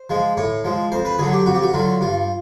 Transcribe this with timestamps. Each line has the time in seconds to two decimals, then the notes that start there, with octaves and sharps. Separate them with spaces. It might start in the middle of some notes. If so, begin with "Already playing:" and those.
Already playing: C5
0.10 F3 G#3
0.37 A2 C#5
0.64 F3 G#3
0.92 F2 C5
1.05 B4
1.19 D3 F#3 G#4
1.33 G4
1.46 F2 F#4
1.55 G4
1.63 F#4
1.74 D3 F#3 F4
2.01 G2 F4